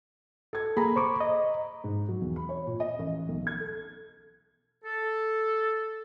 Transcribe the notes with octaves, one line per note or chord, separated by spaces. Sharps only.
A4 G#6
A#3 G#4 A#5 B5
C5 C#6 D6
D#5
G#2
F#3
E1
B5
C#5
A#2
D#5
A1
B1
G#6
A4
A4